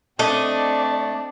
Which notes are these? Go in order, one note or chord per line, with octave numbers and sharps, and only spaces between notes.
A3 C4 D4 D5 D#5